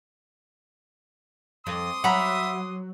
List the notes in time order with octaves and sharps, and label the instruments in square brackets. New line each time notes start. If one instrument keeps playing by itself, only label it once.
[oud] F2 [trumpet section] C6 D6 D#6
[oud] F#3 [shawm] E5 [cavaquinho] F#5 A#5 B5